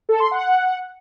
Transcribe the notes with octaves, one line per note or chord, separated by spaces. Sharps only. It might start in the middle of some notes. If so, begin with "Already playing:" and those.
A4
C6
F#5